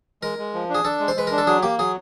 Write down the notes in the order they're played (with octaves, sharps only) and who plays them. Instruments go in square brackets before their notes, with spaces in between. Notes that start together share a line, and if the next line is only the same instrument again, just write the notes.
[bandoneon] G#3 [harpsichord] A#4
[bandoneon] G#3
F3
D4
[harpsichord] G#4
[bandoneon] D4 [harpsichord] A4
[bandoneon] G#3
[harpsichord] C5
[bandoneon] G#3 [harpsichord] B4
[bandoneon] D4 [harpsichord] A#4
[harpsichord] A4
[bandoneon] F#3 [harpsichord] G#4
[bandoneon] A#3 [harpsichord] G4
[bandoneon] F#3 [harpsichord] G#4